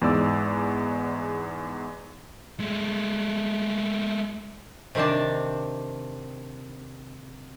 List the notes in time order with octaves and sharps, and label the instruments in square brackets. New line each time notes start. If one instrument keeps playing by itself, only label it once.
[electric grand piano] E2 G#2 D5 E6
[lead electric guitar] G#3 A3
[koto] C3 D#3 C4 D4 A5